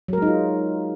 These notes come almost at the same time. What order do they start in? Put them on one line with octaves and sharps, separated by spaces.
F#3 A#4 G#3 D#4 F4